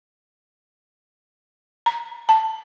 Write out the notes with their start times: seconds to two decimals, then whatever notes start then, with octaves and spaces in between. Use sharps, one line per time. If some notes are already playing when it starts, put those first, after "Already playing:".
1.86 A#5
2.29 A5